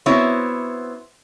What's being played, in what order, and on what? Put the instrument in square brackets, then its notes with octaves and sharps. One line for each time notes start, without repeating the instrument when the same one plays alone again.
[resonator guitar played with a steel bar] B3 C4 E4 F#4 C#5